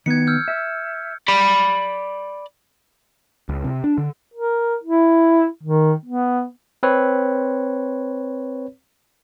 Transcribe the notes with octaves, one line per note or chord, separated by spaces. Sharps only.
D#3 B3 G#6 C#7
E6 F6 G6
E5
D5 B5
C#2
C3
D4
D3
A#4
E4
D#3
B3
C4 B4 C#5